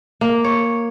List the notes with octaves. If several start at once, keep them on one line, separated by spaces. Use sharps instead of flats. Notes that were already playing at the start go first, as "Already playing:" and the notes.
A#3
C#5